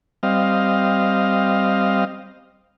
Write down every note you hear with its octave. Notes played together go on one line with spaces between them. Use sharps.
G3 C4 D#5 F5